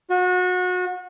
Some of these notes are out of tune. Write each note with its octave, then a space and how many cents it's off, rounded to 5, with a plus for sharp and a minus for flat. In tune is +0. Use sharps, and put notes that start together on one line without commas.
F#4 -30